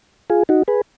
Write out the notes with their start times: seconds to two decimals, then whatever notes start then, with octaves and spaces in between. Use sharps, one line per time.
0.30 F4 G#4
0.49 D#4 F#4
0.68 G#4 B4